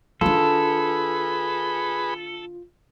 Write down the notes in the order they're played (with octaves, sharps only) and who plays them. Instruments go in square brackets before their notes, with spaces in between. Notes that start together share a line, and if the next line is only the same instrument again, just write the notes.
[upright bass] D#3 D4 [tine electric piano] F4 [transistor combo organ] G#4 B4 B5 [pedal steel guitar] A4